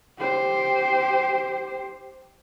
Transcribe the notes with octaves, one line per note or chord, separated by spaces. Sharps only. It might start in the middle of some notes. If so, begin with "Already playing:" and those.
G4 C5